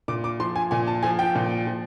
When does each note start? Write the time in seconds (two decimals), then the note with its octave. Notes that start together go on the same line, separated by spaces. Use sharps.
0.08 A#2 D6
0.24 D6
0.40 F3 C6
0.56 G#5
0.71 A#2 G#5
0.87 A5
1.03 F3 G#5
1.19 G5
1.35 A#2
1.67 F3